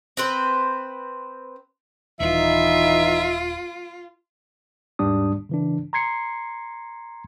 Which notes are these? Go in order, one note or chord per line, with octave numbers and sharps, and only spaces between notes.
C4 B4 C5
D#1 E3 D#4 F4 E5
D#2 G#2 G3 D4 D#6
C#3 E3 D4
A#5 C6 G#6 C7 C#7